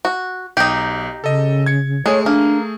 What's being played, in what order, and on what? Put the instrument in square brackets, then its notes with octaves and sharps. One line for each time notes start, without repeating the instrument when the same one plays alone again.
[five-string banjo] F#4
[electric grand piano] B1 [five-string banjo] D#4 G4
[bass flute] C#3 [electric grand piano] A4 D#5
[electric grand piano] G#6 C#7
[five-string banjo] G#3 [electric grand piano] A3 G#4 [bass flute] C#5
[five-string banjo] A#3 [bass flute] D4